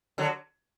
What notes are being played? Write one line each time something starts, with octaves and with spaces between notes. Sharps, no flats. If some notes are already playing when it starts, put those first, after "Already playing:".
D3 F#3